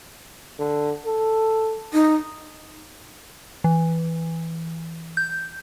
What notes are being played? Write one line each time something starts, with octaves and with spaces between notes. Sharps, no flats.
D3
A4
D#4
E3
G6